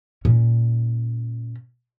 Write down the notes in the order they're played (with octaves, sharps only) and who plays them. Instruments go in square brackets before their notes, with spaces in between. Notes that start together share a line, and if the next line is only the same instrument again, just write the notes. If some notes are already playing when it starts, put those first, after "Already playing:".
[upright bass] A#2 C#4